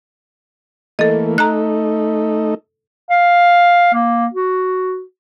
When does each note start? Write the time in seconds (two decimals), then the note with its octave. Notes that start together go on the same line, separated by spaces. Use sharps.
0.99 E3 A3 A#3 A4 D#5
1.38 A3 D#4 A#5 F#6
3.10 F5
3.94 A#3
4.33 F#4